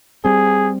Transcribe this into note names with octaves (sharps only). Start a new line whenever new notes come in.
G3 C4 G#4